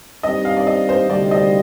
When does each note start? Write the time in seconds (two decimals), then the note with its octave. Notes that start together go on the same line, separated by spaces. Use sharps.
0.23 G2 D#3 G3 C4 D#5
0.45 F5
0.57 D5
0.67 D#5
0.89 C5
1.10 D2 C3 D#3 G3 D5
1.31 D#5